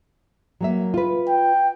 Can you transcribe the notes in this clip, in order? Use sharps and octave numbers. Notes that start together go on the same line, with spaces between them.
F#3 A#3 E5
F4 B4
G5